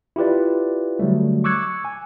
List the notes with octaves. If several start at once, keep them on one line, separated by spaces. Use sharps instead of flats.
E4 F4 G4 B4 D5
D3 F#3 G3 A3
C#6 D6 E6 F#6 G#6 C#7
G#5